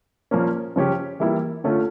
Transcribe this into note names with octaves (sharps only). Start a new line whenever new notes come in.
A#2 F3 A#3 C#4
C#3 F3 C#4 G4
E3 G3 A#3 E4
D3 A3 C#4 F4